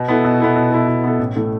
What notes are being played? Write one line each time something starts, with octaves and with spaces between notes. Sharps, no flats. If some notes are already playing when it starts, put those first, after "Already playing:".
Already playing: B2
B3 E4 A4
B2
B3 E4 A4
B2
B3 E4 A4
B2
B3 E4 A4
A1
A2 A3